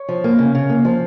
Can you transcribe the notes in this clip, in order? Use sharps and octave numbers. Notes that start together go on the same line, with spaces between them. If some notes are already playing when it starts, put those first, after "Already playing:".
Already playing: C#5
F3
A#3
C#3
C#3
A#3
F3